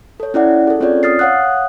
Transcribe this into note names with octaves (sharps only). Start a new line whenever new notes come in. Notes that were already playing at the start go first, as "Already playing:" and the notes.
A4 C#5
C#4 E4 D5 F#5
G#4 A4
C4 C#4 F4 C#5 D5
D#6 F6 A6 C7
C#5 F5 F#5 D#6 F#6